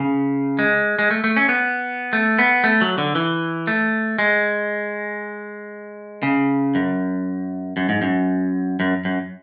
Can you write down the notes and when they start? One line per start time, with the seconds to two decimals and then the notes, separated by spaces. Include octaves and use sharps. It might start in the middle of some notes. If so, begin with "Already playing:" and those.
Already playing: C#3
0.59 G#3
0.99 G#3
1.11 A3
1.24 A3
1.37 C#4
1.49 B3
2.13 A3
2.39 B3
2.64 A3
2.81 F#3
2.98 D3
3.15 E3
3.67 A3
4.19 G#3
6.23 C#3
6.75 F#2
7.77 F#2
7.89 G#2
8.02 F#2
8.80 F#2
9.05 F#2